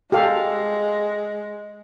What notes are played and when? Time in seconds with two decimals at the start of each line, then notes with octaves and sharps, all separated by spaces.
0.12 G#3 G4 A4 F5